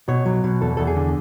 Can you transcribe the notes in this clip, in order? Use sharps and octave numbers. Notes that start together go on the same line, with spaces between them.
B2 C#5
F#3
B2
E2 A4
E2 A4
G#4
D3